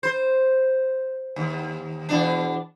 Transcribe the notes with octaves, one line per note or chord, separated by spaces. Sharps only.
C5
D#2
E2 B2 D4